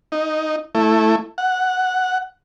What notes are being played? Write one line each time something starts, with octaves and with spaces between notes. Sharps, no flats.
D#4
A3 E4
F#5